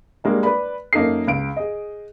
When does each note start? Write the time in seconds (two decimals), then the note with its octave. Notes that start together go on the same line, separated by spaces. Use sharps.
0.24 G3 G#3 A#3 D4
0.43 B4 D5 B5
0.93 F#2 A#3 D#4 A4 C7
1.27 C#2 D7
1.57 G#4 D#5